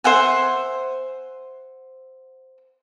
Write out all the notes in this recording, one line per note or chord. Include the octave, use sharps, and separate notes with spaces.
C5 E5 F#5 G#5